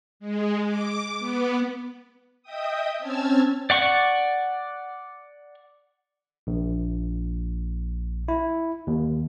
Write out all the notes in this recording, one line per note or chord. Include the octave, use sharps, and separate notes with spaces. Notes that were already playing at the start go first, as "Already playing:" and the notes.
G#3
D6
B3
D#5 E5 G5 D#6
C4 C#4 A5 E6 F6 G#6
D5 F#5 C#6
A#1
E4
D#2